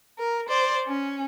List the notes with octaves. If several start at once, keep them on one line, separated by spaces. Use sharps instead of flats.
A#4
C5 D5
C#4